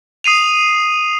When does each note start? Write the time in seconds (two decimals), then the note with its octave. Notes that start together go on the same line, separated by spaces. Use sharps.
0.24 D#6 C7 D#7 F7